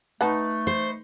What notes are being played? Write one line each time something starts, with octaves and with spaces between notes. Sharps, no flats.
A3 D#4 B4 F#5 A5
C5